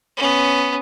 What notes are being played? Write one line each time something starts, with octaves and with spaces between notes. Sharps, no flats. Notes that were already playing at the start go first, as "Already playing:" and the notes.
B3 C#4